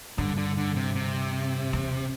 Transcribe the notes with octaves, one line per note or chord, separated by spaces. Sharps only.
G2 D3
D3
D3
C3
C3
E2